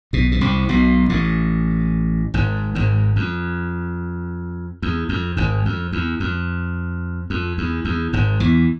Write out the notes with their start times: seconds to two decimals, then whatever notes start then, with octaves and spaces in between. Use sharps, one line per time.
0.13 B1 B2
0.32 B2
0.41 C2 C3
0.69 B1 B2
1.10 A1 A2
2.34 G#1 G#2
2.75 G#1 G#2
3.16 F2
4.82 E2
5.09 F2
5.37 G#1 G#2
5.65 F2
5.93 E2
6.20 F2
7.30 F2
7.58 E2
7.85 E2
8.13 G#1 G#2
8.40 E2 E3